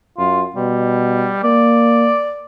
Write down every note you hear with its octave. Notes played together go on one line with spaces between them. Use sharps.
F#2 F4
B2 G3
A#3 D5